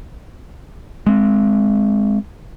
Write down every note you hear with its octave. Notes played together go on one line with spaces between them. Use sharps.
G#3 C4